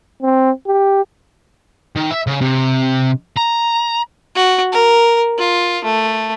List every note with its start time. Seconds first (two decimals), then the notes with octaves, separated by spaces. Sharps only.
0.23 C4
0.67 G4
1.96 D#3
2.11 E5
2.27 C#3
2.41 C3
3.37 A#5
4.35 F#4
4.72 A#4
5.38 F4
5.84 A3